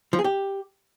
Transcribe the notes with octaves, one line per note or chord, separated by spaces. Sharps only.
F3
G#4
G4